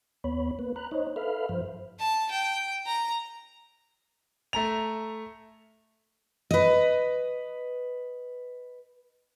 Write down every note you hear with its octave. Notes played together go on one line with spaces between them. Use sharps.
D#2 B3 C#5 B5
A#3 B4
A#5 B5 F#6
D#4 C5 C#5 D#5
A4 B4 E5 F5 B5 F6
G2 F3 C5
A5
G5
A#5
A3 A#5 F7
B4 D#5